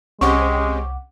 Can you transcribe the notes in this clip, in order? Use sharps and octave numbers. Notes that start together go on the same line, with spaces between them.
C2 G#3 C4 C#4 G4 F#5 C#6 D6